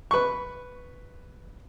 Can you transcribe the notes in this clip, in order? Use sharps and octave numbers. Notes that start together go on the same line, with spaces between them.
B4 C#6